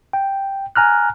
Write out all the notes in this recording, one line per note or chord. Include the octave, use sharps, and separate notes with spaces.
G5
G#5 A#5 F6 F#6